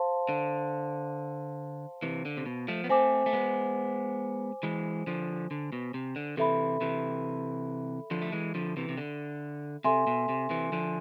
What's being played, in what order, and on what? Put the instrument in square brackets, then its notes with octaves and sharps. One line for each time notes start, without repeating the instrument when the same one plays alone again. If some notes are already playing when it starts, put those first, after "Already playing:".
Already playing: [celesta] C5 F5 A5 C6
[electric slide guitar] D3
C3 E3
D3
C3
B2
F3 A3
B3
[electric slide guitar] A3 C4 [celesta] C5 G#5 D6
[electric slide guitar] A3
G#3 B3
E3 G#3
D3 F3
D3
B2
C3
D3
[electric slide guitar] C3 E3 [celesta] A4 E5 B5
[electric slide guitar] C3 E3
D3 F3
A3
E3 G#3
D3 F3
C3 E3
C3
D3
[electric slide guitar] C3 [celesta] A4 E5 G#5 C6
[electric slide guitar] B2
C3
C3 E3
D3 F3